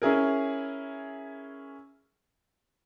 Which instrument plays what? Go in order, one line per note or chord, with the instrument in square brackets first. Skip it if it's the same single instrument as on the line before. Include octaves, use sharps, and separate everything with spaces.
[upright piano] C#4 E4 G#4 A#4